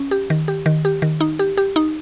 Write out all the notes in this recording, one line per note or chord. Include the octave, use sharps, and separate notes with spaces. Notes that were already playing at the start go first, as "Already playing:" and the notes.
Already playing: C#4
G4
D#3
G4
D#3
G4
D#3
D#4
G4
G4
D#4